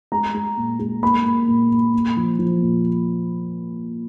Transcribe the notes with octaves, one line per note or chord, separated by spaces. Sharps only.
G#3 A#5
G#3
A#2
G#3
A#3 B5
A#3
A#2
A#2
A#2
F3
F3
A#2